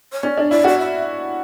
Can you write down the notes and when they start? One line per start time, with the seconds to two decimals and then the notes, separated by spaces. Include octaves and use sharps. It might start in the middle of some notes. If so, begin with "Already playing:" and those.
0.12 C#5
0.23 C#4 D5
0.37 D4
0.51 E4 D5
0.64 F#4 D5
0.79 E5